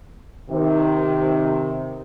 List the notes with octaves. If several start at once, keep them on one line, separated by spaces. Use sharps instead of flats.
C3 D#3